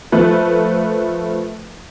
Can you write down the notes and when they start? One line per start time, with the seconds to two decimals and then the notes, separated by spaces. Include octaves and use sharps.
0.12 F3 A3 B4